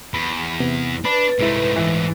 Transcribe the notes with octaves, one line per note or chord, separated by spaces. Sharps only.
E2 B5
C3 B3
D4 B4 B5
C2 G#2 G#3 A3 E4
E3